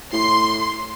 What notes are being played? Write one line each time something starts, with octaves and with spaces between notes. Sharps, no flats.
A2 C6